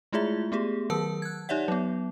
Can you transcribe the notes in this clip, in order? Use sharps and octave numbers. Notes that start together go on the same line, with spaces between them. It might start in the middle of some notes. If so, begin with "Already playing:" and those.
G#3 A3 E4 F4 G#4 E5
A3 B3 G4 G#4
D#3 F#3 A#4 A5 E6
F#6 G#6
D#4 G4 C#5 D5 E5 F#5
F#3 B3